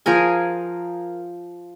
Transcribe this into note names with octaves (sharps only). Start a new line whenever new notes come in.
F3 G#4 A#4 G#5